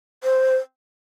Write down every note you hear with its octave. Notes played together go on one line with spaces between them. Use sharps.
C5